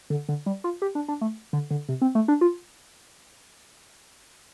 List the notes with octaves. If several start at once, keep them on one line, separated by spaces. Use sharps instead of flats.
D3
D3
G3
F4
G4
D4
D4
A3
D3
D3
C3
C4
A3
D4
F4